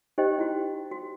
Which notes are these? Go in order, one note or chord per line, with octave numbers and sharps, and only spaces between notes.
D#4 G4 C5 D#5 G5
E4 F#4
F#4